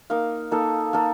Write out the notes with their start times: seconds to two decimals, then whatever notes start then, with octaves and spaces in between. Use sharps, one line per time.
0.10 A#3 D#4 A#4 F5
0.51 A#3 D#4 A4
0.93 A#3 D#4 A4